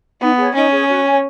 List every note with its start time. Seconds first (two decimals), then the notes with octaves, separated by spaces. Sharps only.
0.20 B3 D#4
0.37 G#4 C#5
0.54 C#4 D#4
0.71 G#4 C#5
0.88 F#4
1.06 C#5 G#5